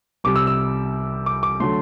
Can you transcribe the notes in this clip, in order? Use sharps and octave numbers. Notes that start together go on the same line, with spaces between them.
C2 C3 G3 D6
E6
E6
D6
D6
D3 F#3 A3 C6